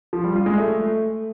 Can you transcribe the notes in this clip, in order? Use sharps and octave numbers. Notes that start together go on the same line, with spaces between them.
F3
G3
F4
G#3
A3